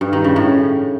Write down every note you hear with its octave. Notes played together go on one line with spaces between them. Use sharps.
G2
D#3
C#3
A2